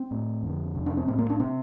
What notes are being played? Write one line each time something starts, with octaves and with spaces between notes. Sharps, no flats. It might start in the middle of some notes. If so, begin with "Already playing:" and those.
Already playing: C4
A2
F2 D3
F2 C3
D4
C4
A2 C4
A#3
D4
C3 C4